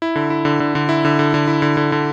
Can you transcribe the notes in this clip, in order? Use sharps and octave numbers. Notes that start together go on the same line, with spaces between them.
E4
D3
E4
D3
D3
D3
E4
D3
D3
D3
E4
D3
D3
D3